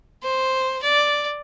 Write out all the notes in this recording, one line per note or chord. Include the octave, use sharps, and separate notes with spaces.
C5
D5